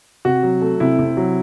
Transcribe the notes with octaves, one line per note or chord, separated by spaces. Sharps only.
C3 F#4
F#3
A3
C3 E4
C3
F#3